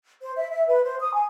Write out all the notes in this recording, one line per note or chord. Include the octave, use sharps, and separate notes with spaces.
C5
E5
E5
B4
C5
D#6
G#5